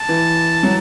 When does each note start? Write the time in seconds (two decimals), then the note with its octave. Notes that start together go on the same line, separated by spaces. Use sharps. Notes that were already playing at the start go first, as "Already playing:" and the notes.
Already playing: A5
0.09 E3
0.63 F#3